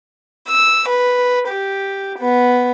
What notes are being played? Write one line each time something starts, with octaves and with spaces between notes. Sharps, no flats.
E6
B4
G4
B3